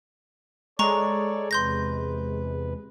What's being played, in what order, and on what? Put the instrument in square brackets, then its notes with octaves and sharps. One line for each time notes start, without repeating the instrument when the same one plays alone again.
[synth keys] G#3 [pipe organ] A4 C#5 D5 [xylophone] A#5 C#6
[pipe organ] E2 C3 B4 [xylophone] C6 G6 A#6